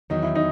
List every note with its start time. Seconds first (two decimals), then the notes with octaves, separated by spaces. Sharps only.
0.10 E2 D#3 F#3 D#4
0.23 E4
0.35 D#4